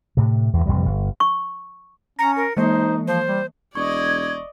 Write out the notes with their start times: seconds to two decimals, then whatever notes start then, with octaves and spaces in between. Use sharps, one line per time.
0.17 A2 C3
0.53 E2 G2
0.66 A1 F2 C3 G3
0.86 G1
1.20 C#6
2.19 C#4 A#5 A#6 C#7
2.36 A#4
2.57 E3 G#3 A#3 D#4 C5
3.07 F3 C5
3.27 G3
3.75 E1 D5 D#5 C#6 G#6